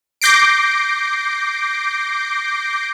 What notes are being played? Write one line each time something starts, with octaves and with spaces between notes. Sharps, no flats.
D6 G6 A#6 C7 D7